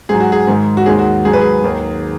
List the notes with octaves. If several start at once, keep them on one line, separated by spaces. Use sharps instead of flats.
G#2 F#3 G#4
F#4
G#4
G#2 D#3 G#3
F#4
D#2 D#3 G#3 G#4
F#4
G#2 F#3 G#4
B4
G#4
D#2 D#3 F#3